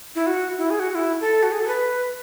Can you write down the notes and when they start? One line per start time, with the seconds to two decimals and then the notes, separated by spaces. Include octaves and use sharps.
0.15 E4
0.27 F#4
0.58 E4
0.70 G#4
0.80 F#4
0.90 F#4
0.95 E4
1.21 A4
1.43 F#4
1.52 G#4
1.60 A4
1.68 B4